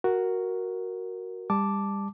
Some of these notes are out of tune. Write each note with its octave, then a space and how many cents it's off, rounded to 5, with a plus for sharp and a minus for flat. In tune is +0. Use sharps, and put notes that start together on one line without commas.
F#4 +0 A#4 +0
G3 +30 A5 +0 D6 +0